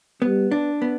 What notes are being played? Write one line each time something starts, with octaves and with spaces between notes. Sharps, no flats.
G3 B3
D4
B3